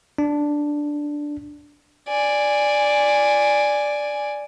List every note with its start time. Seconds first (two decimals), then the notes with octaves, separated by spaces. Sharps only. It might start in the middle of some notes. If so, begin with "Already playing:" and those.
0.18 D4
2.08 D5 G#5